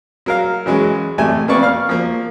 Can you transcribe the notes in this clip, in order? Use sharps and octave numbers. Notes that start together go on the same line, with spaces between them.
F#3 A#4 F5
E3 F#3 G#3 C#4
A1 C3 A3 G#5
F2 A#3 B3 D5 C#6
F5 F6
F3 A#3